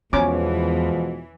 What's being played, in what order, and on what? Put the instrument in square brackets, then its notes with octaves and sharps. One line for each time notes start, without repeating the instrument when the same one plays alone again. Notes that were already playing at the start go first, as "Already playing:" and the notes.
[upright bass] E2 [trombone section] B2 F3 G#3 [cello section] E3 [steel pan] C#4 D6